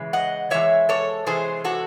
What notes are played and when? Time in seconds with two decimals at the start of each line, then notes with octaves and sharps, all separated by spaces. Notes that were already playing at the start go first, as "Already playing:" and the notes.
Already playing: C#3 E3 G#3
0.13 D#5 F#5
0.50 C3 E3 G#3 C#5 E5
0.89 A4 C#5
1.26 C3 E3 G#3 G#4 C5
1.64 F#4 A4